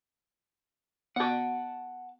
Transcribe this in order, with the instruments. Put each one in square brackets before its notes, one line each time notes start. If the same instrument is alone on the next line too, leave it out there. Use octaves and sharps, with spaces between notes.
[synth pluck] B3 F#4 [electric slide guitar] F#5 A5